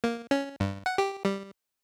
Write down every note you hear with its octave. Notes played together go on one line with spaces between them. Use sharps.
A#3
C#4
G2
F#5
G4
G3